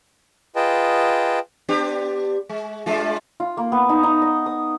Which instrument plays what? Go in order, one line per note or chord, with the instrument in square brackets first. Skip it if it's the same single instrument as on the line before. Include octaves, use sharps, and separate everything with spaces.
[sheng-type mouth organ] F4 G#4 B4 D#5 G5 A5
[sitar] B3 D4 G4
G#3
G2 G#3 F4
[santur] F4
A#3
B3
D#4
D#4
D#5
D#6